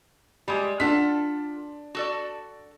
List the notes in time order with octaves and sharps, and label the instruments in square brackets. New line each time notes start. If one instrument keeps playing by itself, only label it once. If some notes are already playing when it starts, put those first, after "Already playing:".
[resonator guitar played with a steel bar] G3 G#3 [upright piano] B5
[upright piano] D4 B6 [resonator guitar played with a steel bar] F4 A4 F#5
[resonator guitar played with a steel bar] F#4 A4 D5